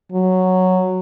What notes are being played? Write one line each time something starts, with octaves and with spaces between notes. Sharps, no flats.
F#3